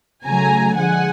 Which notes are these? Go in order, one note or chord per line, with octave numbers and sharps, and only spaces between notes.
C#3 F#3 A3 G#5 A#5
D3 F3 G#3 F#5 G#5